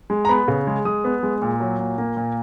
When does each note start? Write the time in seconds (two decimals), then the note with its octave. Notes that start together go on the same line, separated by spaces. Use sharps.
0.10 G#3
0.25 A#5
0.29 B3 B5
0.48 C#3
0.67 G#3
0.85 G#3 D#6
1.04 B3
1.23 G#3
1.42 A#2
1.60 F#3
1.79 A#2
1.98 A#3
2.17 A#2